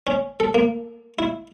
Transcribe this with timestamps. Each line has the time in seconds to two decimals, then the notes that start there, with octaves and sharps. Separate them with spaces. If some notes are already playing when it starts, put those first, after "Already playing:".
0.07 C#4
0.40 A4
0.55 A#3
1.19 E4